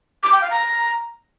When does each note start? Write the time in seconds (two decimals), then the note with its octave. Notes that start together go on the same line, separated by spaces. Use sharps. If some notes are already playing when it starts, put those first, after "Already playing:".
0.23 D6
0.32 G5
0.42 F5
0.51 A#5